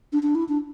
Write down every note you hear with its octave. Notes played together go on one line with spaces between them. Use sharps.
D4
D4
E4
D4